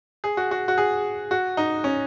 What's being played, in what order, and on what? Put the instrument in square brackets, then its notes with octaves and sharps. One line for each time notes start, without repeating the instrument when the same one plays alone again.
[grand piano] G#4
F#4
F#4
F#4
G#4
F#4
D#4
C#4